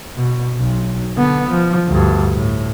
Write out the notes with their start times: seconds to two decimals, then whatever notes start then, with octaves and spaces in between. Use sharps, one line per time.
0.16 B2
0.58 B1
1.16 D3 B3
1.50 F3
1.88 D2 G2
2.35 A2